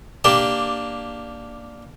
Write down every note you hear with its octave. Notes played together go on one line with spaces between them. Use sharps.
A#3 D4 G4 A5